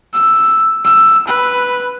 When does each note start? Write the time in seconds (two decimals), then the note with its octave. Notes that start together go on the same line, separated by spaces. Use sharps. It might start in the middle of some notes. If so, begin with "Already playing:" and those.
0.14 E6
0.85 E6
1.28 B4